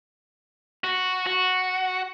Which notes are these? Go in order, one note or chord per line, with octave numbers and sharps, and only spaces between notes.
F#4
F#4